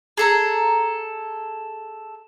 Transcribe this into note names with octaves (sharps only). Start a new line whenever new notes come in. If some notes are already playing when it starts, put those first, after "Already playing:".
G#4 A4 A#5